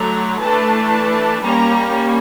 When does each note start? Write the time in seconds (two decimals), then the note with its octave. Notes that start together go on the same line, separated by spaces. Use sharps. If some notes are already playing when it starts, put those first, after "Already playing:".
Already playing: D3 F#3 A3 A#5
0.41 E3 A3 D4 A5
1.42 G3 A#3 C#4 A#5